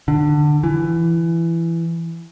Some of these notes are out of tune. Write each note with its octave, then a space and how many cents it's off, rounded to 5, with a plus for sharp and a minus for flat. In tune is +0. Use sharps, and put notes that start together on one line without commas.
D3 +20
E3 +15